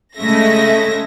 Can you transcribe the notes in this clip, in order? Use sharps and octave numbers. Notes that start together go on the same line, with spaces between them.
C#3 G#3 A3 E5 A#6